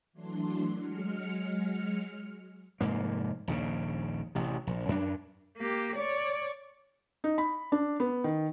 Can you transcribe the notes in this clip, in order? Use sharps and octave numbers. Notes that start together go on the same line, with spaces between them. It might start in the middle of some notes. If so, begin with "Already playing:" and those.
E3 F#3 A3 D4 C6
F#3 G#3 F6 C#7
F1 G#2 A#3
A#1 D#2 C#3
A1 C3
A#1
F#2 D4
A#3 G4
C#5 D5
D#4
B5
D4
B3
D#3